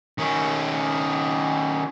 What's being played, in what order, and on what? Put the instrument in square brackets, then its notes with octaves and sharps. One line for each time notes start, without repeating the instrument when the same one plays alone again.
[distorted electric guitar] D#3 C#4